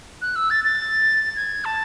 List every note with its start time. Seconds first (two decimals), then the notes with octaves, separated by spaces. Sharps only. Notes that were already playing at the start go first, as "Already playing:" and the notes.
0.22 F#6
0.36 E6
0.50 A6
0.64 A6
1.36 G#6
1.65 A5